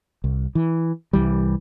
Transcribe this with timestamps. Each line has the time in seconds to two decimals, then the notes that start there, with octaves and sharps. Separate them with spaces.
0.24 C2
0.55 E3
1.13 C2 E3 G3